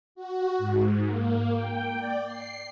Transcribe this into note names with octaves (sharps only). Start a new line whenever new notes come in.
F#4
G#2
A#3
G5
D5
C7